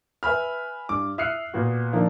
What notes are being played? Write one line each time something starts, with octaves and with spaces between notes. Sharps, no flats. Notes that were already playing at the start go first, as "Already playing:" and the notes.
B4 E5 G#5 B5 F6
G2 D6
E5 D#6 F6 F#6 C7 C#7
A#2 B3 F#4
D3 D#3 F3 A#3 D4